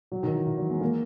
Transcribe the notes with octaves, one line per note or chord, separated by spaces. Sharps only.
F#3
D#3
E3
E3
F#3
G#3
A#3